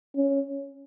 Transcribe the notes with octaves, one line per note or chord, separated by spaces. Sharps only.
C#4